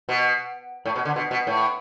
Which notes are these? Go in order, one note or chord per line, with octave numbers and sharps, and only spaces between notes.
B2
A2
B2
D3
B2
B2
A2